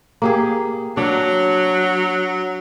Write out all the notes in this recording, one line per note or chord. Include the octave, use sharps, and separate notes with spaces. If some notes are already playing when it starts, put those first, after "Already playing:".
A#3 G4 G#4
F#3 D4 F5